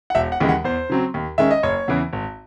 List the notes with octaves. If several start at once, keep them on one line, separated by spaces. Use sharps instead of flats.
F#5
E1 E5
F#5
D#2 C#3 E3 G#3
F#5
E2 C5
C#3 F#3 C4
D#2
D#3 G#3 C#4 E5
D#5
F#1 C#5
E2 C#3 E3
G#1